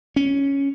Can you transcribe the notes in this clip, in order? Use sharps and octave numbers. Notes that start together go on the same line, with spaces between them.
C#4